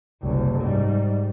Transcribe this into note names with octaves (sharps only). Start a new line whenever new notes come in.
F#1 C2
G#2 G3